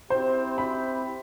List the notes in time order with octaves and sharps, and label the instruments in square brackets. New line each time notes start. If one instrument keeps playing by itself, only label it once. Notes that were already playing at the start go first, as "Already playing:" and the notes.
[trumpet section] C4 E4 G4 [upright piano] C5
[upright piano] B5